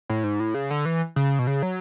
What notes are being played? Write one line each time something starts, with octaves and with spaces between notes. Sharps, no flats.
A2
G#2
A2
C#3
D3
E3
C#3
B2
C#3
F#3